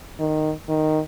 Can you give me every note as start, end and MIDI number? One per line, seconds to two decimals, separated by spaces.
0.19 0.52 51
0.69 1.00 51